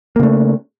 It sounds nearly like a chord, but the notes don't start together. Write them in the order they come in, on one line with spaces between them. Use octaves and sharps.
A#3 C#3 A3